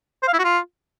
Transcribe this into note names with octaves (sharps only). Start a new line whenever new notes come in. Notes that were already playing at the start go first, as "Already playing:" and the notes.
C5
F5
E4
F#4
F4